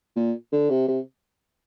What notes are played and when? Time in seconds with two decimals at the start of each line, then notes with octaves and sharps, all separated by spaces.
0.16 A#2
0.52 D3
0.70 C3
0.88 C3